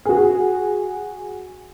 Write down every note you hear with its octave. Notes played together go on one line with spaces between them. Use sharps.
F#4 G#4